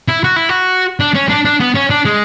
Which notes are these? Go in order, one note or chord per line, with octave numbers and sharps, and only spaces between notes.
E4
F#4
E4
F#4
D4
C#4
D4
D4
B3
C#4
D4
G#3